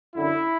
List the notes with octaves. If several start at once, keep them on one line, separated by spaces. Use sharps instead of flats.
F#2 D3 E4